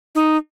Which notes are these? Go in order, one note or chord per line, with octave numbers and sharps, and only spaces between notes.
D#4